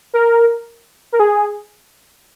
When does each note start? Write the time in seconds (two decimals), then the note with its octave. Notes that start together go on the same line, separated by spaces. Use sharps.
0.14 A#4
1.12 A#4
1.20 G#4